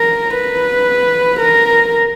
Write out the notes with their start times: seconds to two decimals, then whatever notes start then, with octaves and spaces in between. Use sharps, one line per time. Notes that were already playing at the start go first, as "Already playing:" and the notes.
Already playing: A#4
0.36 B4
1.40 A#4